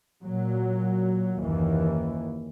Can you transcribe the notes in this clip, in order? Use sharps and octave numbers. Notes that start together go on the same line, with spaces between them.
A#2 F#3
F#1 D#2 E3